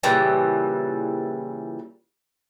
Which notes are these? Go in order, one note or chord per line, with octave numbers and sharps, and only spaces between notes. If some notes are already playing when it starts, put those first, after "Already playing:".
A#2 C#3 E3 G3